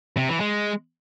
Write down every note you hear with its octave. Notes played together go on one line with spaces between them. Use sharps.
C3
E3
G#3